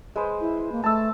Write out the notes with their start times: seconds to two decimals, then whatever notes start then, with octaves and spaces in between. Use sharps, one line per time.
0.16 G#3 B4 C5
0.41 E4
0.72 A#3
0.84 A3 A5 E6